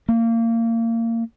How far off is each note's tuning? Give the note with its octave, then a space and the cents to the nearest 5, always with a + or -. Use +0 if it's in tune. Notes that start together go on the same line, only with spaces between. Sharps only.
A#3 -25